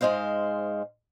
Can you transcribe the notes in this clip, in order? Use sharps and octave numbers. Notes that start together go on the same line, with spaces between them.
G#2 F#3 G#3 C5 F5